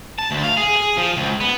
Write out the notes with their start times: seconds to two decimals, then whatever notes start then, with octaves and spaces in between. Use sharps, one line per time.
0.19 A5
0.31 D2
0.44 F5
0.57 G#4
0.76 G#4
0.97 F3
1.17 C#2
1.40 B3